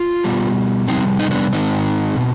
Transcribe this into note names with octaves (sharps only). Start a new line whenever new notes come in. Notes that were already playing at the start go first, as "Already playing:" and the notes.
Already playing: F4
B2 G3
F2 C3 G3 C4 D#4
D#4
B3 D4
G#2 D#3 G#3 C4 D#4
B2